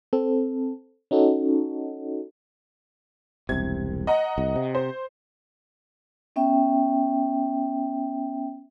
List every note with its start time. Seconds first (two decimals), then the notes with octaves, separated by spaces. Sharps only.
0.13 C4 A4
1.11 C#4 D#4 F#4 A4
3.49 E1 C2 C3 G#6
4.07 D#5 F#5 A#5
4.38 C2
4.56 C3
4.75 C5
6.36 B3 C#4 E5 G5